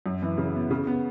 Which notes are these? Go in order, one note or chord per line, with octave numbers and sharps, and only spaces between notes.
F#2
E3
C#3
B3
C#3
B3